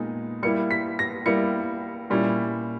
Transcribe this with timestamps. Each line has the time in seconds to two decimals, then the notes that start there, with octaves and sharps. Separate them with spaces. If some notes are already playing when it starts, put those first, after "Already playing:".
Already playing: A#2 G#3 B3 D#4
0.43 G3 A#3 E4 C#7
0.71 B6
0.99 A#6
1.26 G3 A#3 E4 C#7
2.10 A#2 G3 C#4 E4